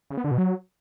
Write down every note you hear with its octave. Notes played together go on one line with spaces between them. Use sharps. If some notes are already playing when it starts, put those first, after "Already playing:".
C#3
B3
D3
B2
F#3